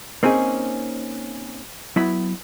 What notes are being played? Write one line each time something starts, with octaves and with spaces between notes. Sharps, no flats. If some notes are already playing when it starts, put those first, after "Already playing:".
A#3 C4 C#4 D#4 G#4
F#3 B3 E4 B5